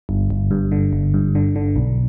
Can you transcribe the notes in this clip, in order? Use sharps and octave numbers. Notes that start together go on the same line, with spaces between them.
G1
G1
G2
D3
G1
G2
D3
D3
B1